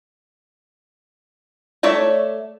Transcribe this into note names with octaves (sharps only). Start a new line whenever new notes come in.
A3 C#5 D5 E5